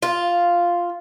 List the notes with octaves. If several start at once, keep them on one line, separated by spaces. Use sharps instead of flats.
F4